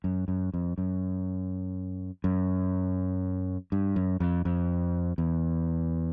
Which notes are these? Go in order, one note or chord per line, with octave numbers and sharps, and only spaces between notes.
F#2
F#2
F2
F#2
F#2
G2
F#2
F2
F2
E2